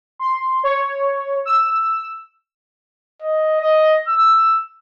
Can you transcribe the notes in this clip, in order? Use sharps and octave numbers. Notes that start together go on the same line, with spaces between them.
C6
C#5
E6
D#5
D#5
E6